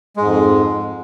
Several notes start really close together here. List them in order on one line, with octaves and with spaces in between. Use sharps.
G#3 G#2 F2